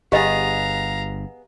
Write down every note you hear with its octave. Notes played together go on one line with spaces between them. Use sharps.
G1 B3 G4 G#4 D#5 F5 A#5